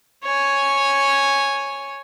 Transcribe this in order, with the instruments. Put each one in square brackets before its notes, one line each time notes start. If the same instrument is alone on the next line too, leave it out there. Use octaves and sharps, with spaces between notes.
[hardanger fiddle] C#5 G#5